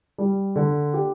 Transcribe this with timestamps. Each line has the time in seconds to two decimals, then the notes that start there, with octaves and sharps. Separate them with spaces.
0.18 G3
0.56 D3
0.94 G4